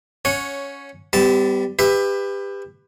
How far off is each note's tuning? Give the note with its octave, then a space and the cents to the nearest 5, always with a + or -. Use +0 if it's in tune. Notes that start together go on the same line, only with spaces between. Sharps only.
C#4 +10 C#5 +0 F#5 -20
G3 +0 B3 +40 A5 +0
G4 +25 B4 +15 E5 +0